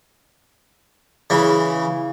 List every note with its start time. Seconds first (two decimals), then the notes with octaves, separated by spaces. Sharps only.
1.30 C#3 E3